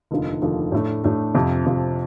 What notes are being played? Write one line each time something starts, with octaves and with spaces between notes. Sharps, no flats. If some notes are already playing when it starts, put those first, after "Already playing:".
F1 D#2 D3 F3
F1 D#2 D3 F3
A2 A3 D4
A2 A3 D4
F2 C3 F3
F2 C3 F3